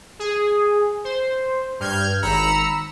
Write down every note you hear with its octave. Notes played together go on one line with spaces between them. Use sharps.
G#4
C5
G2 F6 G6 G#6
G#1 A#5 B5 E6 C#7